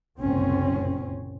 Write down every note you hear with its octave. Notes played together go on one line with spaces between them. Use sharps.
F#1 C2 A#2 C4 C#4